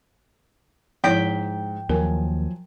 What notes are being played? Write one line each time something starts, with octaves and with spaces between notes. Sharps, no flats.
G#2 F3 E4 C#5 G5 B6
D#2 F3 F#3 A#4 G#5